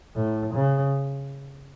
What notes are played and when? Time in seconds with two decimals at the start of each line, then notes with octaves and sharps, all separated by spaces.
0.16 A2
0.54 C#3